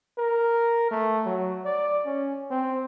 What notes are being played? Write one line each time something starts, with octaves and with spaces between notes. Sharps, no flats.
A#4
A3
F#3
D5
C#4
C4